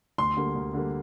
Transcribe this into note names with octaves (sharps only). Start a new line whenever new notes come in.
D2 C6
D3 G3 A#3
D2
D3 G3 A#3